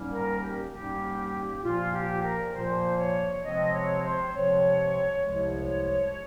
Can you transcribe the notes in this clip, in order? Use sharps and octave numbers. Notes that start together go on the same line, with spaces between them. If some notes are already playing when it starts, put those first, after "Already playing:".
Already playing: G#2 G3 A#3 C#4
A#4
G4
G#2 G3 A#3 C#4 G4
A#2 F3 A#3 F4
G4
A#4
A#2 F3 A#3 C5
C#5
C3 F3 G#3 C4 D#5
C#5
C5
C3 F3 G#3 C4 C#5
C2 C3 F3 G#3 C#5